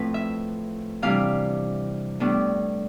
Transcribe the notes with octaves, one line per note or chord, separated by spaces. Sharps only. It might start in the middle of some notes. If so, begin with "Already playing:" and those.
Already playing: A2 F3 C4 B4
E5
C3 E3 G3 D4 F5
A2 G3 B3 D4